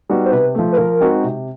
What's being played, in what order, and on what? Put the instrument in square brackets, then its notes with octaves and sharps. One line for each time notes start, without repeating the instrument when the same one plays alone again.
[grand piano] G3 B3 D#4 F#4
[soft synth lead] C5
[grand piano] C3 [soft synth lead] B4
[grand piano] F3 A3
[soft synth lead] B4
[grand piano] F3 [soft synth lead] A#4
[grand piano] G#3 C4 D#4 F#4
C3